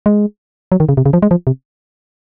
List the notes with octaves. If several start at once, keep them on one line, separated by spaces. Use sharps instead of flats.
G#3
F#3
D#3
C#3
C3
C#3
F3
G#3
F3
C3